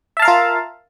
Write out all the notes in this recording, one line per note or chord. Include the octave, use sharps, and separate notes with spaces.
F4 A#4 E5 F5 A5